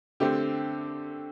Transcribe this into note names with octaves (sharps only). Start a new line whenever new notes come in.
D3 A3 C4 G4